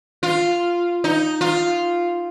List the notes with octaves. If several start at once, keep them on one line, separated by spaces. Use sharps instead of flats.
F4
D#4
F4